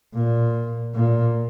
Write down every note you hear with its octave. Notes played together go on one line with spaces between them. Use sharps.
A#2
A#2